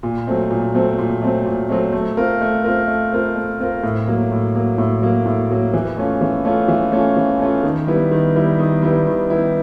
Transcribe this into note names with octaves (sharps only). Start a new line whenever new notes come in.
A#2
F#3 A3 C4
A#2
F#3 A3 C4
A#2
F#3 A3 C4
A#2
F#3 A3 C4
A3
C4 F4 A#4
A3
C4 F4 A#4
A3
C4 F4 A#4
A3
C4 F4 A#4
A2
F#3 A#3
A2
F#3 A#3
A2
F#3 A#3
A2
F#3 A#3
E3
A3 C#4 F4
E3
A3 C#4 F4
E3
A3 C#4 F4
E3
A3 C#4 F4
D#3
G3 B3 E4
D#3
G3 B3 E4
D#3
G3 B3 E4
D#3
G3 B3 E4